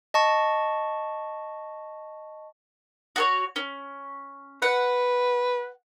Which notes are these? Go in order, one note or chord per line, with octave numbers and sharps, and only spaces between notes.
D#5 A5 C#6
F#4 A4 C#5
C#4
B4 F#5